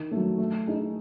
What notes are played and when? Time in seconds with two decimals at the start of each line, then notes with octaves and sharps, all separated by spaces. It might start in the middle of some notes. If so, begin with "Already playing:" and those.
Already playing: D#3
0.11 F#3 A3
0.38 A3
0.67 D#4 G#4